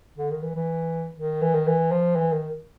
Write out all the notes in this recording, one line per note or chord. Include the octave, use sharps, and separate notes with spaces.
D3
D#3
E3
E3
D#3
E3
D#3
E3
F3
E3
D#3